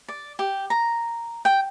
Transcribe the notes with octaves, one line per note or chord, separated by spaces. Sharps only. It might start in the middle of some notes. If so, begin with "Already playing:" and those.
D5
G4
A#5
G5